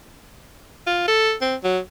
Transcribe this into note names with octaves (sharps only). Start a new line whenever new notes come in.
F4
A4
C4
F#3